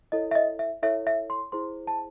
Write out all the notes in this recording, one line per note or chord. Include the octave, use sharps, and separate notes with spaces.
E4 A4 C#5 D#5
E5
D#5
E5
E4 A4 C#5 E5
E5
C6
E4 G#4 C5 C6
A5